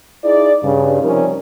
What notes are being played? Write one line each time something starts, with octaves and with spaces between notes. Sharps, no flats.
D#4 E4 G#4 D5
G2 C#3
C3 F3 G3 C#4 D#4 A#4